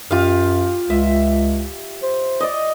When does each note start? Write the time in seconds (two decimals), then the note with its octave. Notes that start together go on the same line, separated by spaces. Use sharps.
0.11 F#2 F4 G4 F5
0.90 C#2 E5
2.03 C5
2.40 D5 D#5